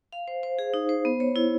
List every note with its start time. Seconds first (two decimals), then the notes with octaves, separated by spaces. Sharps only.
0.13 F5
0.28 C5
0.43 C5
0.59 G#4
0.74 D#4
0.89 C5
1.05 B3
1.20 C#5
1.36 E4